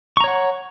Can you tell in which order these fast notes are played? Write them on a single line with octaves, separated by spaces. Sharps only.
C#6 A#5 C#5 F#5